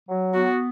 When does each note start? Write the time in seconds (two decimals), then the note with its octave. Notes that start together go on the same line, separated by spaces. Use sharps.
0.08 F#3
0.34 B3 F#4